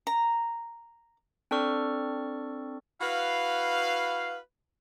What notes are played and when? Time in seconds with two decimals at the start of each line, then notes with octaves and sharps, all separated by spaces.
0.07 A#5
1.51 C4 D4 A4 D5 C#6 F6
3.01 E4 F#4 B4 F5